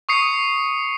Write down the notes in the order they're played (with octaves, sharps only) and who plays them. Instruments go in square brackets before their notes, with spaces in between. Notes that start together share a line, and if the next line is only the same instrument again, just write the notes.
[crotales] C#6 D#6 C7 C#7